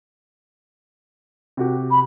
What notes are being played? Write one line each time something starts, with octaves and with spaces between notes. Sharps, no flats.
C3 F#4 G4
B5